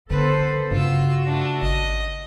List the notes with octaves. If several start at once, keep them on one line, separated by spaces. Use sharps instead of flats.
D3 B3 A4 B4 C5
G2 C#3 F4 F#4 E6
A3 D4
G#1 D#5